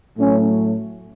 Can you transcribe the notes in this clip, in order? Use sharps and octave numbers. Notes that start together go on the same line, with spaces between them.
A2 F#3 A3 C#4